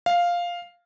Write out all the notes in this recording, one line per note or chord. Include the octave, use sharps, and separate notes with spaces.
F5